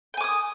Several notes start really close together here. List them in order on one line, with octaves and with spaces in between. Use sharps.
G5 G#5 D6 D#6